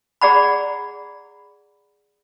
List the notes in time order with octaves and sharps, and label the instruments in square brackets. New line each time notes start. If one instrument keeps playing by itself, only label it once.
[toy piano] G#4 D5 F#5 A#5 B5